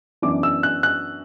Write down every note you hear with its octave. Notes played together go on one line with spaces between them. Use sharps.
F#2 E3 B3 D4 D6
E6
F#6
F#6